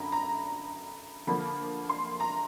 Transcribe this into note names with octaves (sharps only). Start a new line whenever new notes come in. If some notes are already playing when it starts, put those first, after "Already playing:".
Already playing: F#2 D3 A#5 B5
A#5
D3 F3 A#3 B5
C6
A#5